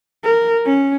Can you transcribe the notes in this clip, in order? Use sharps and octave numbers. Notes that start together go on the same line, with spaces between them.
A#4
C#4